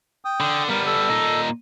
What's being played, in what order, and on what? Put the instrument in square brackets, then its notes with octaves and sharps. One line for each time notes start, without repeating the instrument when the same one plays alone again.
[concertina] G5 D#6
[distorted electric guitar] D3
[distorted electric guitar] G3 B3 [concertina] A#4
[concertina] A4
[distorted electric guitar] A#2 D#4